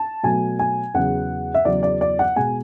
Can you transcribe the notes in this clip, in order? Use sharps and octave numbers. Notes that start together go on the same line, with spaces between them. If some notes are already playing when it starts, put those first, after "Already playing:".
Already playing: A5
B2 F#3 A3 G#5
G#5
E2 C#3 F#3 F#5
E5
E2 C#3 F#3 D5
D5
D5
F#5
B2 G#3 G#5